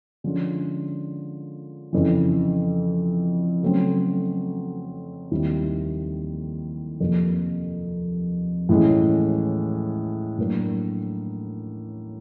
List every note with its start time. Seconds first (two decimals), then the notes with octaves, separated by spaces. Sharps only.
0.24 D3 F3 G#3 C#4 F4
1.93 F2 C#3 E3
3.63 C#3 F#3 A3 C4
5.31 D#2 D#3 G3 C4 E4
7.00 F2 C3 F3 A#3
8.69 A2 E3 G#3 C#4
10.38 A2 F#3 A#3 D4